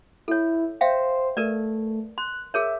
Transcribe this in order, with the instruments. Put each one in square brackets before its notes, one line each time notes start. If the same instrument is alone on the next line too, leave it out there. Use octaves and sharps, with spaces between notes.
[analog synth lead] E4 [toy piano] A4 C#5
[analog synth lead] C5 [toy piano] E5 F5 G5
[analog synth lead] A3 [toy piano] A#4 B4 D5
[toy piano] C6 [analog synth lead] F#6
[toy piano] G#4 A#4 C#5 [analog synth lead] E5